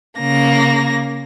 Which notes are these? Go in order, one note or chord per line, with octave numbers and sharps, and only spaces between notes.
C#3 A#3 A#6